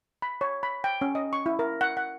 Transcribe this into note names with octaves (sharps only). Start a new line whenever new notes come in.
B5
C#5
B5
G5
C#4
D#5
C#6
E4
A#4
F#5
F#5